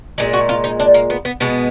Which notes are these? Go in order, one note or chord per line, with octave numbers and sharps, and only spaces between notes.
A#2 G#3 G#4
F#4
F4
D#4
D4
A#3
B3
B3
B2 G#3 B3